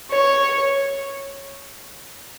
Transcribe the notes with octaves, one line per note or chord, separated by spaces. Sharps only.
C#5